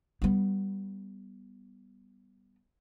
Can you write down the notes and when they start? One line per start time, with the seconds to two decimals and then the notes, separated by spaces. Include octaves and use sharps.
0.22 G3 B3